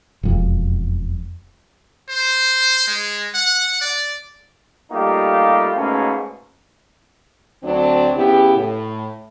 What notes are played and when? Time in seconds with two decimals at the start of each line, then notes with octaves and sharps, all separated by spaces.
0.23 E1 F2
2.09 C5
2.88 G#3
3.34 F#5
3.81 D5
4.92 G3 A3 A#3 D#4 F4 G4
5.76 G#2 B2 A3 A#3 C#4
7.63 D2 F#3 C4 D4
8.15 C#3 B3 E4 G4
8.57 A2